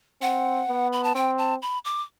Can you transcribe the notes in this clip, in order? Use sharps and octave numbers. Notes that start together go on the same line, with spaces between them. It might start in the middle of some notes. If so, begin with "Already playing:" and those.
C4 F#5
B3
B5
A5
C4 G5
A5
B5
D6